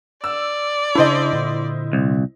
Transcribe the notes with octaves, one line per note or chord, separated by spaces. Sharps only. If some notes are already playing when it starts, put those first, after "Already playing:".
D5 E6
C#3 D4 E4 C5 D#5
A#2 D3
C2